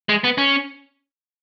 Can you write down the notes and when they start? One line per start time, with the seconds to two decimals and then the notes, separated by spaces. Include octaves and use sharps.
0.09 G#3
0.24 B3
0.38 C#4